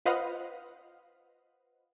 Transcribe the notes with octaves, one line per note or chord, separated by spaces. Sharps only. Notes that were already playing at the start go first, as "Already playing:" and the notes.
F4 B4 C5 D#5 F5 F#5